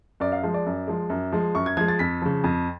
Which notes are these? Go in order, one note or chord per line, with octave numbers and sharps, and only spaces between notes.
F#2 D5
F5
F3 G#3
D5
F#2
F3 G#3
F#2
F3 G#3
F#2 C#6
G#6
F3 G#3 G#6
A6
F2 B6
C#3 F3
F2